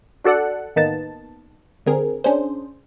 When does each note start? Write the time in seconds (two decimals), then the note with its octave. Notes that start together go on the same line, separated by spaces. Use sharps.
0.24 D4 F#4 A4 D5 F#5
0.76 A1 D#3 A#3 B3 D#4 A5
1.86 G#1 D3 C4 G#4 A#4
2.24 C#4 D4 G#4 C5